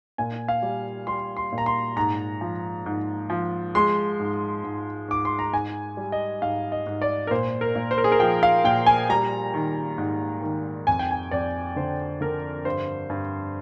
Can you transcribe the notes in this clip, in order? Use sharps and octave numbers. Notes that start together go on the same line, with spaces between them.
A#2 G#5
F5
G3
G3 C6
C6
A#2
A#5
C6
G#2 A#5
F3
G#2
F3
G#3 C6
G#2
G#2
G#2 D6
C6
A#5
G#2 G#5
G3
D#5
G#2 F5
D#5
G#2
D5
A#4
A#2 C5
A#4
A#2
C5
A#4
G#4
A#4
F3 G5
F5
A#2 G5
G#5
G3 A#5
D#3
G#2
D#3
F2 G#5
G5
G#5
F2 D5
D3 C5
D3 A#4
G2 C5
G2